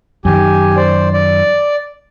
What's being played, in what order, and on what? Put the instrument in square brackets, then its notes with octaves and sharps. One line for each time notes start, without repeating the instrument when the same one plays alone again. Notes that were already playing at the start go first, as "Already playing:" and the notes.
[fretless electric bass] F#2 D#3 [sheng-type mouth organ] G4 G#5
[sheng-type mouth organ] C5 D5
D5